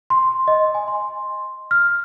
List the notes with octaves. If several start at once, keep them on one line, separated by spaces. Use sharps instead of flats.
C6
D#5
G#5
C6
F6